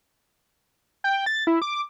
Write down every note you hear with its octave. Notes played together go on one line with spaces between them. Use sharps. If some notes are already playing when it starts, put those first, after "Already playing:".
G5
A6
E4
D6